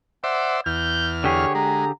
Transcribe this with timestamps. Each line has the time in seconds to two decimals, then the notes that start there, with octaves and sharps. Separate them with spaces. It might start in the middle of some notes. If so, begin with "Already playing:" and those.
0.24 C5 D5 E5 F#5
0.66 E2 F6 G6
1.24 D3 G4 G#4 C#5
1.55 G#3 A#5